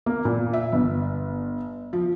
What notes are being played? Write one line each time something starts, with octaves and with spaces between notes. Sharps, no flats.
A#3
A#2
E5
G1
F3